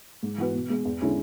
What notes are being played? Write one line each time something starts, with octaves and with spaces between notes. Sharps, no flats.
G#2
E3 B3 F#4 B4
B2
G#3 B3
E2
D3 G#3 C#4 E4